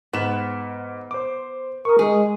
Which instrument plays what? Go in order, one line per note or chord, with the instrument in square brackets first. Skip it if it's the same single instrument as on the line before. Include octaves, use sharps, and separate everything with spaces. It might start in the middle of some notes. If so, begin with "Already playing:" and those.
[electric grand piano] G#2 E7 [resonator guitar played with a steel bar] B3
[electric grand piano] C5 D6
[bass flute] A#4 [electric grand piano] C#6 D#6
[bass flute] G#3 [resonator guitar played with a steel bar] G#4